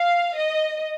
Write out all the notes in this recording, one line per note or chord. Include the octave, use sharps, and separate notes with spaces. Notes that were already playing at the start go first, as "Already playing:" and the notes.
Already playing: F5
D#5